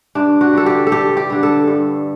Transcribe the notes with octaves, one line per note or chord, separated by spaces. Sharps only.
G2 D4
F#4
D3 G3 A4
G4
A4
G2 G4
G4
D3 G3
A4
G2